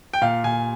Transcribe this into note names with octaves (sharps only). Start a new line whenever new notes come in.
G5
A#2 F5
A#2 G#5